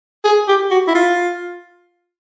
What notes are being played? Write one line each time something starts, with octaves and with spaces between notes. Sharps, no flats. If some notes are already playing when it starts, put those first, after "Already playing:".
G#4
G4
F#4
E4
F4